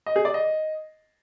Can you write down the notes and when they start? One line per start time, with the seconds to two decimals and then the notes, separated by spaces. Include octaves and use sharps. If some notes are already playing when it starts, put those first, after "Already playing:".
0.06 D#5
0.16 G#4
0.25 D5
0.34 D#5